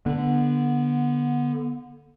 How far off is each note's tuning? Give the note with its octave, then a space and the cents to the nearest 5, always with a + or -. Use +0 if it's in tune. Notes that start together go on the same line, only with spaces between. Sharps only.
D3 +0 B3 -20